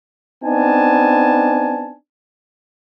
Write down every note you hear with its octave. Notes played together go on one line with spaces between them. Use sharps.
B3 C4 D4 D#4 G#5 A5